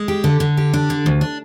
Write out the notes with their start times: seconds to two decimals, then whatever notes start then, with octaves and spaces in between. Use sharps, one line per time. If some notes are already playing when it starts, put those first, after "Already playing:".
Already playing: G#3
0.08 G4
0.24 D3
0.40 D3
0.57 G4
0.74 D4
0.90 D3
1.06 D2
1.21 D4